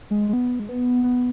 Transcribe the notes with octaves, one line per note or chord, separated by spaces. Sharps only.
G#3
G#3
B3
G#3
B3
B3